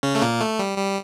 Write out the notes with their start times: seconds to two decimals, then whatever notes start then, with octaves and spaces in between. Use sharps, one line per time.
0.03 C#3 C#4
0.15 A3
0.22 A#2 A#3
0.41 A3
0.59 G3
0.78 G3